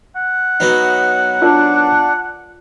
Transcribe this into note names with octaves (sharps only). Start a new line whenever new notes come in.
F#5
F#3 B3 D#4
D4 F4 A#4 D5